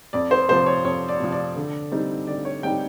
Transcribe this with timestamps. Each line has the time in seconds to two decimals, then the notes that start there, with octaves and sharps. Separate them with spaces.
0.13 F2 D5
0.31 C5
0.49 C3 F3 C5
0.66 C#5
0.84 F2 C#5
1.09 D5
1.20 C3 F3
1.32 D5
1.56 D3
1.92 G3 C4 D#4
2.27 D3 D5
2.45 C#5
2.63 G3 C4 D#4 G5